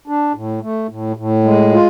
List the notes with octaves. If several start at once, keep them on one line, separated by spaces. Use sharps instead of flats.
D4
A2
A3
A2
A2
G#3
F4